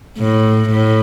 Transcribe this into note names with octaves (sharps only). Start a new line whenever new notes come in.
A2
A2